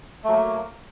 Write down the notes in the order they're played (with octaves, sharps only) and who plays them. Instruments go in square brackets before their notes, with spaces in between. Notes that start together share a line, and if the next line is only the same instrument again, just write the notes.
[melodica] A3
F#3
A#3